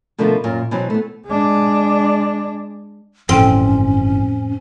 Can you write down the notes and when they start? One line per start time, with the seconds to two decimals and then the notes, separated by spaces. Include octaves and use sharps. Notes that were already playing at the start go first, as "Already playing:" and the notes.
0.18 B2 D3 F3 A3 B3 A#4
0.44 F#2 A#2
0.71 B2 E3 F#3 C4
0.90 A3 B3
1.26 G#3 D4
3.29 G1 F2 A2 E3 C4 C#4